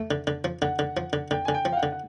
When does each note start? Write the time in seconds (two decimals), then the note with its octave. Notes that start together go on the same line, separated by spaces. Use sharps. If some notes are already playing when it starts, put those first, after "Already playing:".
Already playing: A3
0.11 D3
0.27 D3
0.44 F3
0.62 D3 F#5
0.79 D3
0.97 F3
1.13 D3
1.31 D3 G5
1.45 D3 G#5
1.54 G5
1.65 F3
1.72 F5
1.77 F#5
1.83 D3
1.92 F#5